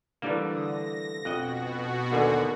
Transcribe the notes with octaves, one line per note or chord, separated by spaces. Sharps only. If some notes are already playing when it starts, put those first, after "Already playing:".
D3 E3 G3 A3 A#3 D4 A4
D#6 A#6
F2 B2 F#4 D#5 F#5 F#6
D#2 D3 A#4 G#5